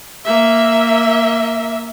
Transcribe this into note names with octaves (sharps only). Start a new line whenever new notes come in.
A#3 E5